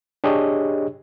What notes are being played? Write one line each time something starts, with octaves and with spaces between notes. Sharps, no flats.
D4 G4 G#4 C#5 D#5